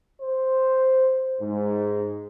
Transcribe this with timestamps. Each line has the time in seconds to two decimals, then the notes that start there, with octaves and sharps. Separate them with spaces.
0.21 C5
1.41 G#2